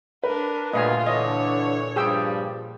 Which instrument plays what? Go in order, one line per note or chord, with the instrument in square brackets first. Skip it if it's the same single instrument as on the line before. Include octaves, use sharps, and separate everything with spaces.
[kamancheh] D4 A#4 [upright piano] B4
[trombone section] D2 G2 B4 [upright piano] A#2 [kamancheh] F4 [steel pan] D#5 F5 G#5
[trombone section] D3 E3 D4 [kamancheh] C#5 [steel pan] D#5
[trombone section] G2 F3 G3 [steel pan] G#4 G5 E6